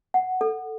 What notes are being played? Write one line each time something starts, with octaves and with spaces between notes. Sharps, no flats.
F#5
A4